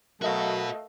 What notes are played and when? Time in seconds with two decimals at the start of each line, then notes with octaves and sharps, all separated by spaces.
0.22 F#3 A3 F#4 A#4 B4 D#5 F5